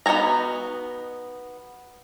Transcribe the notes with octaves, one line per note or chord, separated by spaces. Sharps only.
B3 D#4 F#4 G#5 A#5